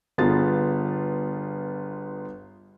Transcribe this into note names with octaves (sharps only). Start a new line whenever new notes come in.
G1 B3 F4 G#4 A6